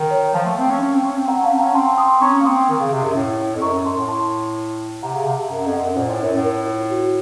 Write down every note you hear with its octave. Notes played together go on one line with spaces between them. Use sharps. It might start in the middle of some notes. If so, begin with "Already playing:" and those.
Already playing: D#3
C#5
F3 F5 A5
A3
C4
C#4
C#4
C4
C#4
C4
C4 F#5 A#5
C#4 F5 A5
C4
C#4 F#5 A#5
C4 A5 C6
C6 D#6
C#4 A#5 C#6
A#3
C4 C6 D#6
D#3
C#3
C3
F#2
A2
F2
F#2 A#5 C#6
F#2
F#2 A5 C6
A2
A5 C6
C3 F#5 A#5
C#3
C3 F5 A5
F#2 F#5 A#5
F2
D#5 F#5
F#2
A#2 C5 D#5
A2
F#2 C#5
A2
A#4
F4
F#4